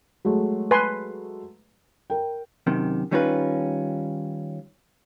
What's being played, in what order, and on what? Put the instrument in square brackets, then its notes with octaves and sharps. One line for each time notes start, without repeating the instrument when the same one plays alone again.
[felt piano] F#3 G#3 A3
[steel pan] B4 G#5 C6
[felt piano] A#4 G5
[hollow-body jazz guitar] F#2 C3 D#3
D#3 G3 C#4 D#4 F4 B4